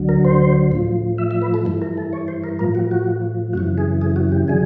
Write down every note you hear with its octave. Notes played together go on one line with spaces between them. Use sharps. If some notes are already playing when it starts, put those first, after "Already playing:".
Already playing: D2 D3 F#3
A#4
C5
A2 F3
E5
E5
B4
A4
G2 E3
A#4
A4
C#5
C5
A#4
A2 F3 A#4
F#4
F#4
F#2 C#3 E3 F#4
G#4
G#4
F#4
G4
D3 F#3 G#4